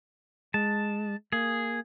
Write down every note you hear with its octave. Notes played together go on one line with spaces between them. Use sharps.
G#3 A5
A#3 G#4